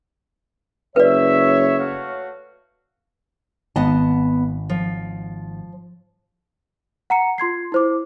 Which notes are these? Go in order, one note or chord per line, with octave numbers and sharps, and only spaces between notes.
F#1 B4 C#5 D5 E5
A3 F#4 F5
G#1 B3 D#5 A5
F3
F#5 A#5 C#7
F4 C6 G#6 C7
E4 C5 D6